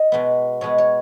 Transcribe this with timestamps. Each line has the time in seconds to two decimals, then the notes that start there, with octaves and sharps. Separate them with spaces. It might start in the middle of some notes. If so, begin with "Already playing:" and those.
Already playing: D#5
0.12 B2 G#3 B3
0.61 B2 G#3 B3 C#5
0.78 C#5